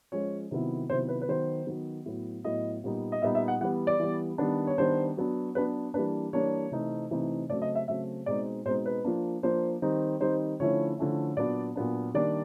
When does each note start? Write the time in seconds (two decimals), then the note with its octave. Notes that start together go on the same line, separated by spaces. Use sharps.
0.12 F3 G#3 C#4 C#5
0.51 C3 D#3 F#3 B3 E4
0.90 C3 D#3 F#3 B3 E4 C5
1.09 B4
1.22 B4
1.29 D#3 F#3 B3 C5
1.67 D#3 F#3 B3
2.06 A2 F#3 B3
2.44 A2 F#3 B3 D#5
2.84 A#2 G3 B3 D#4
3.12 D#5
3.22 A#2 G3 B3 D#4 E5
3.35 E5
3.48 F#5
3.61 E3 G3 B3 F#5
3.87 D5
4.00 E3 G3 B3
4.38 D#3 G3 B3 D4
4.67 C#5
4.78 D#3 G3 B3 D4 C5
5.17 F#3 B3 D4
5.55 F#3 B3 D4 B4
5.94 E3 G3 A#3 D4 B4
6.33 E3 G3 A#3 D4 C#5
6.71 C3 E3 A3 C4 D#4
7.10 C3 E3 A3 C4 D#4
7.49 C#3 F#3 A3 C4 D5
7.62 D#5
7.75 E5
7.88 C#3 F#3 A3 C4 E5
8.26 B2 G#3 C4 D#4 D5
8.66 B2 G#3 C4 D#4 C5
8.86 B4
9.05 F3 A#3 D4
9.43 F3 A#3 D4 C5
9.82 D#3 G3 C4 D#4
10.20 D#3 G3 C4 D#4 C5
10.60 D3 F3 A3 C#4 E4 C#5
10.98 D3 F3 A3 C#4 E4
11.37 A#2 F#3 B3 D4 D5
11.76 A#2 F#3 B3 D4
12.14 D#3 G3 A#3 D4 D5